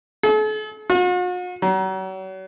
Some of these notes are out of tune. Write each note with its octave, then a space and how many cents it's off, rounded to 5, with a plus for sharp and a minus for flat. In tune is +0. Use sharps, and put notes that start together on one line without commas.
A4 -45
F#4 -45
F#3 +40